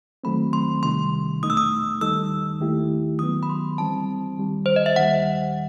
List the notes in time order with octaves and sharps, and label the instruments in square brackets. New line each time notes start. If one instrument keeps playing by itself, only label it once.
[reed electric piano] D#2 D#3 F#3 A3 C4 [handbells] B5
[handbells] C6
[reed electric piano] C2 C3 D#3 G3 [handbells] C6
[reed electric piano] E2 B2 A3 D#4 [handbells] D#6
[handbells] E6
D#6
[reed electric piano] D#2 D#3 G3 D#4 A4 [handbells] E6
[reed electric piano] D#2 D#3 A3 E4 G4
[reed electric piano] D#3 F#3 B3 [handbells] D#6
[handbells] B5
C6
[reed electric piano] E3 G3 C4 [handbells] A5
[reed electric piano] D#2 D#3 G3
[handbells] C5
D#5
E5
[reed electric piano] D#2 D#3 G3 [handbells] F#5